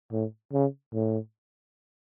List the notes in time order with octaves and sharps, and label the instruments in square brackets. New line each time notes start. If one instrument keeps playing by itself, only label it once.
[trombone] A2
C#3
A2